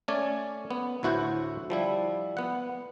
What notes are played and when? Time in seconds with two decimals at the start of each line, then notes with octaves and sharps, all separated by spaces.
0.08 A3 C#4 D5 G#5
0.71 B3
1.03 D2 A2 E4 F#4 C5 F#5
1.70 F3 G3 E4
2.37 B3 F#5